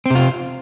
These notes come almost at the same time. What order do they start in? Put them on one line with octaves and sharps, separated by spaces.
C4 C3 F4